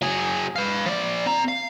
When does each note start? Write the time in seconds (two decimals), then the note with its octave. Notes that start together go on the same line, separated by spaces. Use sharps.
0.02 F#3 G#4
0.56 B4 F5
0.86 F3 D5
1.26 C4 A#5
1.48 F5